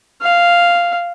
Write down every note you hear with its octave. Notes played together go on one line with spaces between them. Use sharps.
F5